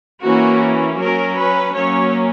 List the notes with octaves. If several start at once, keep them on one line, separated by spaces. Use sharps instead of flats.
E3 A#3 C#4 F#4
F#3 C#4 A#4
B4
F#3 A#3 C#4 C#5